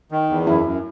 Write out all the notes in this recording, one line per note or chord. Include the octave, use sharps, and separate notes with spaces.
D#3
E2
F#2 E4
F#2